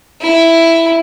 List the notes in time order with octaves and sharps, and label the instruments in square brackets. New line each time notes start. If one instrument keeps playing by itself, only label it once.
[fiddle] E4